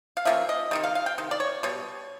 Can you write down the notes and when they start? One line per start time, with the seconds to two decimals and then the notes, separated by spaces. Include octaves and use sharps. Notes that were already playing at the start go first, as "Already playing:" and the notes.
0.17 F5
0.25 F3 A#3 C#4 E5
0.49 D#5
0.71 C3 D#3 G3
0.83 F5
0.95 F5
1.06 G5
1.18 C3 D#3
1.31 D5
1.40 C#5
1.63 B2 G3 C#5